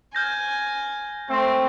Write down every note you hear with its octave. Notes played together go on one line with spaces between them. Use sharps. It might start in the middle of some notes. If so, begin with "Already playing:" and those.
G#5 F6 G6 A#6
A3 C4